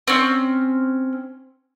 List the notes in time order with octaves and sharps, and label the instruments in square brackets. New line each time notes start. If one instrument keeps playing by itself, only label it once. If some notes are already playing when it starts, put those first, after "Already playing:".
[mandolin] C4 C#4